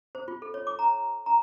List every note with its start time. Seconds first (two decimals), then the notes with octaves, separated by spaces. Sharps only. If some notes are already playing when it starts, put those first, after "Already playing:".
0.15 C5
0.28 F4
0.42 A4
0.54 C#5
0.67 D6
0.79 A#5
1.26 A#5